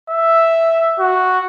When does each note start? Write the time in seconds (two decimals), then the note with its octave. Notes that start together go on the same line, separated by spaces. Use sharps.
0.10 E5
0.99 F#4